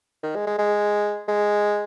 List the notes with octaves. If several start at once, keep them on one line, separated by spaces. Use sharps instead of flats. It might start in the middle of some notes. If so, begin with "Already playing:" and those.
D#3
G#3
G#3
G#3
G#3